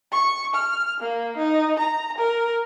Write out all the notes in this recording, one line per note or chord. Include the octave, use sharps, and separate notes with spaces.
C#6
F6
A#3
D#4
A#5
A#4